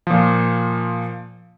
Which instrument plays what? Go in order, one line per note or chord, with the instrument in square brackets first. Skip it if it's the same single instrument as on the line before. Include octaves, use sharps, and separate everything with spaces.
[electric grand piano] A#2 F3